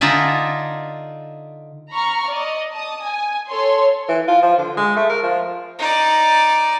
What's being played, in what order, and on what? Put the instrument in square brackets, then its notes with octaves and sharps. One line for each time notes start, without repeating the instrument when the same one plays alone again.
[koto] D3 D#4 F4 D5 E5 G#5
[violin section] A#5 B5 C#6 F6
D5 D#5
A5 D#6
G#5
A4 C#5 C6
[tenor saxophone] E3
F4
F3
D3
G#3
A3
A#4
F3
[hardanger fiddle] D#4 D5